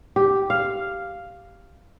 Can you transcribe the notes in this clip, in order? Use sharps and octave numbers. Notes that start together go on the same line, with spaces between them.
G4
F5